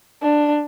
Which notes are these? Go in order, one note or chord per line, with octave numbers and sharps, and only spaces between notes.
D4